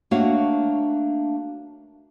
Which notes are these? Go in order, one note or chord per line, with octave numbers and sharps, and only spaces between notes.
A3 A#3 D4 F#4 C#5 F5